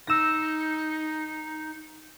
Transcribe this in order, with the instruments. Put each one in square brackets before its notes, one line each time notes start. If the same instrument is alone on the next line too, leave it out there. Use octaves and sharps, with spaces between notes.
[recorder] D#4 [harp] E6 A#6